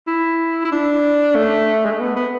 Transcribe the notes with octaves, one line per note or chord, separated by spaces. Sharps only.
E4
E4
D4
A3
G#3
A3
B3
B3